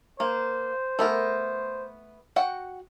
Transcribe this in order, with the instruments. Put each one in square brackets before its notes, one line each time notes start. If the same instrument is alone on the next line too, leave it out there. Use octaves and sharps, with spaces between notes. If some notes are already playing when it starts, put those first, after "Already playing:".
[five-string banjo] A#3 [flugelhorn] C5
[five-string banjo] A3 B3 A#4
F#4 F#5 G5